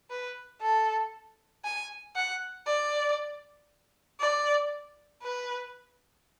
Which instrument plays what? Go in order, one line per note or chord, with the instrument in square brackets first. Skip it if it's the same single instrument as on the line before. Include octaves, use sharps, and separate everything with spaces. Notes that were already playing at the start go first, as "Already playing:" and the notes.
[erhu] B4
A4
G#5
F#5
D5
D5
B4